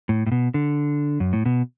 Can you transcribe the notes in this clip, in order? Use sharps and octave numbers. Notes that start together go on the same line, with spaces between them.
A2
A2
B2
D3
F#2
A2
B2